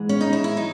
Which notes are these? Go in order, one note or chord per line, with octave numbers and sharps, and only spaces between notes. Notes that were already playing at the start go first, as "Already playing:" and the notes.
Already playing: G#2 E3 G#3
C#4
D#4
E4
E4
F#3 D#4